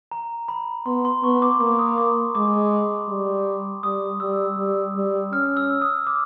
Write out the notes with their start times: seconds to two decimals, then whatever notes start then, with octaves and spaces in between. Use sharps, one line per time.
0.11 A#5
0.48 B5
0.86 B3 C6
1.05 C6
1.23 B3 C#6
1.42 D6
1.60 A#3 D6
1.79 D#6
1.98 D6
2.35 G#3 D6
3.09 G3
3.83 G3 D#6
4.20 G3 E6
4.58 G3
4.95 G3
5.32 C#4 F6
5.57 E6
5.82 D#6
6.07 D6